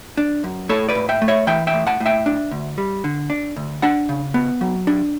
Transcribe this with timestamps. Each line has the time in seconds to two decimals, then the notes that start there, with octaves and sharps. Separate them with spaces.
0.17 D4
0.44 F#2
0.69 A2 A4 C#5
0.89 B4 D5
0.95 A2
1.09 E5 G5
1.22 A3
1.28 C#5 E5
1.47 E3 E5 G5
1.67 E5 G5
1.73 A2
1.87 F#5 A5
2.00 A2
2.06 E5 G5
2.26 D4
2.51 D2
2.78 G3
3.04 D3
3.30 D4
3.56 D2
3.82 D4 F#5 A5
4.09 C#3
4.34 B3
4.61 F#3
4.87 D4